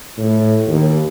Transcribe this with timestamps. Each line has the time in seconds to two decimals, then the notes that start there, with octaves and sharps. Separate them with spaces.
0.17 A2
0.67 D#2